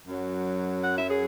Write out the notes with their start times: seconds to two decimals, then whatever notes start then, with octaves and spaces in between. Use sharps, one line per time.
0.07 F#2 F#3
0.83 F#5
0.96 E5
1.08 G#4 C#5